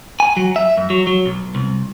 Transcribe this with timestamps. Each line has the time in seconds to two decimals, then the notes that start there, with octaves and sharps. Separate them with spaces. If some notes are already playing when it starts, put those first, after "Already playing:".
0.20 G#5
0.37 F#3
0.56 E5
0.77 F#2
0.90 F#3
1.07 F#3
1.26 B1
1.55 C2